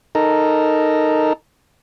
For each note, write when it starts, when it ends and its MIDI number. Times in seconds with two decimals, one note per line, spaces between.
0.15 1.33 63
0.15 1.33 69
0.15 1.33 70